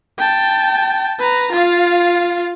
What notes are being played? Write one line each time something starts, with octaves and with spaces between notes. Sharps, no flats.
G5 A5
B4 A#5
F4 F5